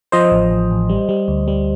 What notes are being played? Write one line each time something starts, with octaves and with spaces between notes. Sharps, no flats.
F3 C5 D#5
A1
A1
A1
G3
G3
D2
G3